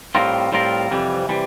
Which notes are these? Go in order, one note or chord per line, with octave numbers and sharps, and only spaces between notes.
A2 G3 C4 F4 A#4
A2 G3 C4 F4 A#4
F2 C3 E3 G3
C3 E3 G3